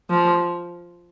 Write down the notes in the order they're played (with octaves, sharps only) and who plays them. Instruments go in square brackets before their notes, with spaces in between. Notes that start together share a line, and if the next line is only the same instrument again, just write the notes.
[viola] F3